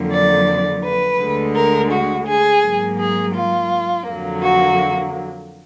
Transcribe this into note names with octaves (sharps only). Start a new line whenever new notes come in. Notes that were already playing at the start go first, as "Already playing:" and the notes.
Already playing: F2 D3 F#3 A#3
D5
B4
D2 D3 G#3
A#4
F#4
G#4
G#2 F#3 A#3
G#4
F4
F2 D3 F#3 A#3
F#4